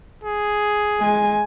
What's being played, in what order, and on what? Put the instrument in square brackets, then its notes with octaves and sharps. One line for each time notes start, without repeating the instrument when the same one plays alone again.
[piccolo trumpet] G#4
[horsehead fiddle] G#3 G#5